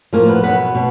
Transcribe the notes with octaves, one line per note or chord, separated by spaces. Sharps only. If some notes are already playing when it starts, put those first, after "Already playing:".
A2 F3 A#3 A#4
B3 B4
B2 F#3 B3 B4
B2